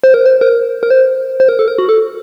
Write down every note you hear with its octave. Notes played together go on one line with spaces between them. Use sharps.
C5
A#4
C5
A#4
A#4
C5
C5
A#4
A4
A#4
F#4
A4